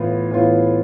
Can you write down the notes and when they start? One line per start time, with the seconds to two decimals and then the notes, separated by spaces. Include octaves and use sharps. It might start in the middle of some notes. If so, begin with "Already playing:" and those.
Already playing: A2 E3 B3 F4
0.31 A2 E3 B3 F4